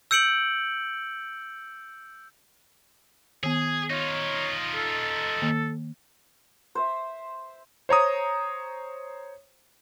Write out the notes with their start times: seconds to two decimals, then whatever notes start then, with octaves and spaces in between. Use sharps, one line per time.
0.11 E6 G6 C#7 D7 F#7
3.43 D#3 B3 G#4
3.90 D#4 F4 C#5
4.76 A4
5.42 D#3 A#3
6.75 C5 E5
7.89 C5 C#5 A#5 D#6